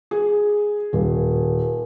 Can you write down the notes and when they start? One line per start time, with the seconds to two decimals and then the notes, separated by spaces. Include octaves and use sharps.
0.11 G#4
0.93 D#1